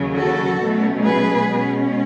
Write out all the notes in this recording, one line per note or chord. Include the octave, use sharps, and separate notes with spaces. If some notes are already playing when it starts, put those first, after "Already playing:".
Already playing: D#2 C#3 F#3
F#4 A4
B2 F#3 A3 C#4
G#4 B4
B2 G#3 C#4